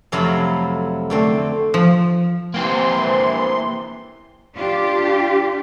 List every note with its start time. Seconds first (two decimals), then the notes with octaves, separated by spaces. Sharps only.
0.12 F2 C3 F#3 A3 E4 F4
1.10 D3 A3 C4
1.74 F3
2.54 C3 E3 A#3 C4 C6
4.55 D4 F4 G4